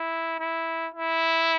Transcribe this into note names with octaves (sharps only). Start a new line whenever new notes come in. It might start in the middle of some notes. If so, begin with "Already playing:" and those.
Already playing: E4
E4
E4